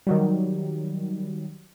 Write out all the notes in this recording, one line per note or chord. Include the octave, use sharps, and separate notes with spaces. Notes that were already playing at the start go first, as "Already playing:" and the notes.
D#3 F#3 G3